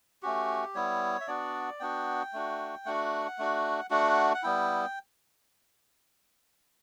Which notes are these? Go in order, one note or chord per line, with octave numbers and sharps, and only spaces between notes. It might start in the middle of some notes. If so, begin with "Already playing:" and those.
A3 C#4 F#4 G4
G3 B3 E4 C#5
E5
B3 D4 F#4 D5
B3 D4 F#4 G5
A3 D4 F#4
A3 D4 F#4 F#5
A3 D4 F#4
A3 D4 F#4 F#5
F#5
G3 B3 E4 G5